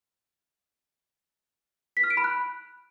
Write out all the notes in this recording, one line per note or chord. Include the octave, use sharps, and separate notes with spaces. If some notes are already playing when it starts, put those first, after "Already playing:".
B6
F6
D7
B5
F#6